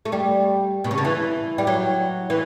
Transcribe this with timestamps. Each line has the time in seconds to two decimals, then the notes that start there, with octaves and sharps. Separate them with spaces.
0.05 A3
0.12 G3
0.84 B2
0.91 C#3
0.98 D3
1.05 E3
1.58 G3
1.67 F#3
2.30 E3